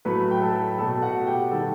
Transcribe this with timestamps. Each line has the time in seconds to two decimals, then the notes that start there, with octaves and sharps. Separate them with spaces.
0.05 A2 F#3 A3 B4 B5
0.31 G5
0.41 A4 A5
0.67 B5
0.78 B2 A3 A4 A5
1.02 F#4 F#5
1.27 G4 G5
1.51 D#3 G3 A4 A5